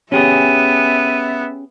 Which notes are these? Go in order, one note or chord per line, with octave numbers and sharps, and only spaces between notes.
B3 C#4 G4 G#4 E5 D#7